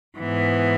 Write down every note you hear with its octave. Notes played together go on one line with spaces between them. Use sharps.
G#2 E3 B3